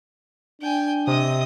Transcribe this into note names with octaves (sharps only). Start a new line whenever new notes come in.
D4 G5 G#5
C3 D#5 D#6